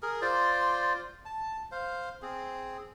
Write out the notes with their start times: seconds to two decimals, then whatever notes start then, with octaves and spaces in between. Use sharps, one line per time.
0.02 G#4 A#4
0.22 F4 C5 D5
1.26 A5
1.72 C5 F5
2.22 C4 G#4